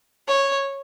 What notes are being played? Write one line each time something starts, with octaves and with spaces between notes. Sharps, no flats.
C#5